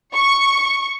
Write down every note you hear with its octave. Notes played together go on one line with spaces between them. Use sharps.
C#6